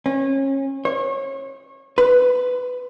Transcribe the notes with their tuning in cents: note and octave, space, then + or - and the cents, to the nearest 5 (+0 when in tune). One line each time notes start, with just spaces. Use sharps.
C#4 -30
C#5 -30
B4 +15